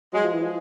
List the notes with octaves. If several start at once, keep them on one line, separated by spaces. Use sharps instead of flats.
F#3 G#3
F3
E3
F3